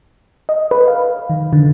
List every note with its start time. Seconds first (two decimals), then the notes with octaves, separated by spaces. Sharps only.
0.49 D#5
0.71 B4
0.88 F5
1.30 D#3
1.53 D3